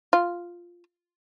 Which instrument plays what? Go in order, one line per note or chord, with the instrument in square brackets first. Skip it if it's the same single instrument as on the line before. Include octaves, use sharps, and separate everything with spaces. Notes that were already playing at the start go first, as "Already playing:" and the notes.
[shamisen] F4